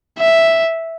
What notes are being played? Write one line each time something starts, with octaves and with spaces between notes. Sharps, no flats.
E5